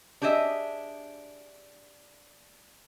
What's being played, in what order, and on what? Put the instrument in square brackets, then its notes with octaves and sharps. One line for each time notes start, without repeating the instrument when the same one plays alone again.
[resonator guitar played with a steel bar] D4 G4 G#4 D#5 E5